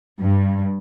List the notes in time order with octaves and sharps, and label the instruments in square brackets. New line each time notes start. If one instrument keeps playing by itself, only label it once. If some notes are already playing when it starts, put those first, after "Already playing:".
[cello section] G2